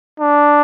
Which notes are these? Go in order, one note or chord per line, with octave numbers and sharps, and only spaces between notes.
D4